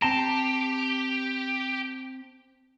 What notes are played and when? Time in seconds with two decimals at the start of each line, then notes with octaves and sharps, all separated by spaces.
0.02 C4 G4 A5 A#5